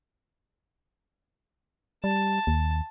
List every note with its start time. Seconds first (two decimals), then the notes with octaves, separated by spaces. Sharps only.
2.04 G3 A5
2.47 D#2